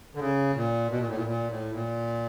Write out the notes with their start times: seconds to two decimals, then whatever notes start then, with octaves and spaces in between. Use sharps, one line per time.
0.15 D3
0.19 C#3
0.55 A#2
0.90 B2
0.99 A#2
1.08 A2
1.16 A#2
1.27 A#2
1.50 A2
1.74 A#2